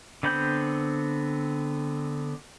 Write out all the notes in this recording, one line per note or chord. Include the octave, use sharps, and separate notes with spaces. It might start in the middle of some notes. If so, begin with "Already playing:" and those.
D3 B3 C4 B5 G6